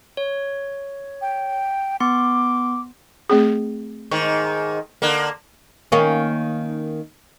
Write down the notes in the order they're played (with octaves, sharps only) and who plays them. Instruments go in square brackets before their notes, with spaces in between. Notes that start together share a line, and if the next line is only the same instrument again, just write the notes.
[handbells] C#5
[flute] G5
[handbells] B3 C6 [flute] D6
[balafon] A3 C4 G#4
[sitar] G#2 D#3 [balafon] C#6
[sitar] D3 A#3
[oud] D#3 A#3 C#4